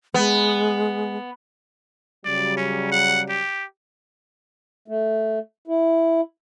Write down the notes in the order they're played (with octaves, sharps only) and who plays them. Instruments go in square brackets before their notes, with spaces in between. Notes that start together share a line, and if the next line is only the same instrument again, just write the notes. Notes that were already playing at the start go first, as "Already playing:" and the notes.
[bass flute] G#3 [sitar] B3
[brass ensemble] C#3 F#3 G3 [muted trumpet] D5
[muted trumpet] C#4
F#5
G4
[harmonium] A3
E4